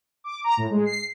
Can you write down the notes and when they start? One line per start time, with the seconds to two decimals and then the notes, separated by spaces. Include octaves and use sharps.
0.24 D6
0.44 A#5
0.57 A2
0.71 G#3
0.85 C7